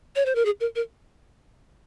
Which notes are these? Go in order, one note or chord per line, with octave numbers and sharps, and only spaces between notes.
C#5
C5
A#4
G#4
A#4
A#4